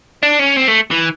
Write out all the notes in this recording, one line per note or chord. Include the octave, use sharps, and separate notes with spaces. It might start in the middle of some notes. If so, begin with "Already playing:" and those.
D4
C#4
C4
A3
E3